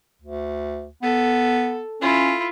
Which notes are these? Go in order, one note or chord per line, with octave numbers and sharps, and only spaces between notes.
D2
B3 A4
C#4 E4 F4